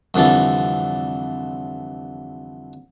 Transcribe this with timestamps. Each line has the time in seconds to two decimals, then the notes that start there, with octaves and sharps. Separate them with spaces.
0.14 C2 F2 D3 E3 A4